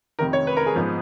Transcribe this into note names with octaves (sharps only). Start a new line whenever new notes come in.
F1 F2 D#3 A#4
C#5
B4
A#4
G#4
G#2 F3 B3